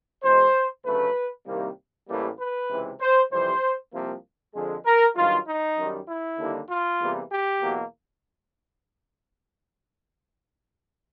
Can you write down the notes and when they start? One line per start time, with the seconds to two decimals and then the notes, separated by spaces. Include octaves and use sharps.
0.23 E2 B2 G#3 C5
0.85 D2 C#3 F#3 A3 B4
1.47 C2 C3 D#3 G3 A#3
2.08 A1 A2 E3 G3 A#3
2.39 B4
2.69 C#2 C3 E3
3.00 C5
3.31 F2 C3 E3 G3 C5
3.92 C2 C3 F3 A#3
4.54 F2 D3 F3 G#3
4.85 A#4
5.16 G2 D#3 F#3 F4
5.46 D#4
5.77 F#2 D#3 G3
6.08 E4
6.38 D#2 D3 G3 A#3
6.69 F4
7.00 E2 C3 E3 G3 A#3
7.31 G4
7.61 E2 B2 F#3 A#3